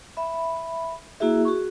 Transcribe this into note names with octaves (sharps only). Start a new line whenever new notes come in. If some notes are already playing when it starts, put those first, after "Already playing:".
E5 B5
A#3 E4 F#4 G#4 E5
F#4 G#4 C#6